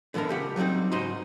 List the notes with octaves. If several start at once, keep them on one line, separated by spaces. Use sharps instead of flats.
D3 E3 B3 D4 A#4
C#2 G4 F#5
F#3 G3 A#3 C4 D#4
C#2 G#2 D#4 F#4 D#5 C6